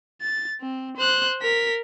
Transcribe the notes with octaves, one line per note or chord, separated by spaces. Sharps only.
A6
C4
C5 F#6
A#4 B6